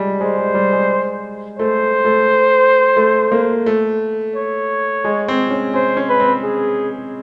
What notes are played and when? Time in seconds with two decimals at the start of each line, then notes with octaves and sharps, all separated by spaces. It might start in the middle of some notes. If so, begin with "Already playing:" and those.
Already playing: G3 G#3
0.21 G#3 C5
0.38 G#3
0.54 G3
0.72 G#3
1.59 A3 C5
2.05 A3
2.97 A3
3.32 A#3
3.66 A3
4.36 C#5
5.04 G#3
5.28 C4
5.51 C#4
5.74 C#4 C5
5.97 C#4
6.09 B4
6.20 C4
6.43 G#4